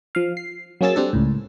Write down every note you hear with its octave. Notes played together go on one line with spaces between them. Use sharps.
F3 F5
C7
F#3 A#3 C#4 G#4 E6 A6
G3 C4 D4 A4
C#2 A2